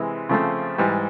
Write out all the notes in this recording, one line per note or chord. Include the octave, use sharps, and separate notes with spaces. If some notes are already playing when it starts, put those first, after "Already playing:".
Already playing: C3 E3 G#3
C#3 F3 A3 C4
G#2 E3 G3